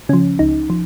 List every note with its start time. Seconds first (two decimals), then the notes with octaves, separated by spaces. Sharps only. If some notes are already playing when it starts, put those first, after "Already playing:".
0.09 C#3 F3 C#4
0.39 C#2 D#4
0.70 F3